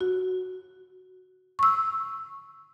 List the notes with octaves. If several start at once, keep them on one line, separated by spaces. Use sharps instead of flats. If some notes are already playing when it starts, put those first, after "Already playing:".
F#4
C#6 E6